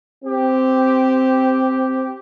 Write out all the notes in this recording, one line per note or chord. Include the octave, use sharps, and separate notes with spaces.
C4 G4